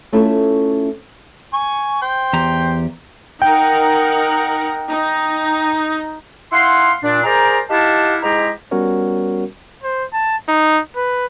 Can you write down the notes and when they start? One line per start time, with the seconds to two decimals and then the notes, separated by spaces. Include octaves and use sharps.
0.13 A3 C#4 E4 F4 A4
1.53 G#5 C#6
2.02 C5 G5
2.33 E2 G4 A#5
3.42 D#4 A#4 F#5 G5
4.89 D#4
6.53 E4 F5 F#5 C6
7.04 A#2 D4
7.24 G#4 A#4 C5 D5 G5 A#5
7.70 D#4 E4 G4 F5 F#5 A5
8.23 G#2 G#3 E4 G4 G#4 A#5
8.71 G3 B3 C#4 F#4 A#4 C#5
9.83 C5
10.13 A5
10.48 D#4
10.96 B4